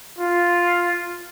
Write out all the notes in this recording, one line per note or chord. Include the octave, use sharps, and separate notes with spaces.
F4